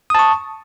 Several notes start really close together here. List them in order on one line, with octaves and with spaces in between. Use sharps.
D#6 A5 C#6